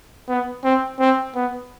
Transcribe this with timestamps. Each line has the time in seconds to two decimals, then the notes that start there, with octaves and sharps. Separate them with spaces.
0.29 B3
0.64 C4
1.00 C4
1.36 B3